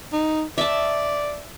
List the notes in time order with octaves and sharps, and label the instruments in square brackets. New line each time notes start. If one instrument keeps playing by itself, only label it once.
[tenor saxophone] D#4
[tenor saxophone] D5 [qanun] E5 A5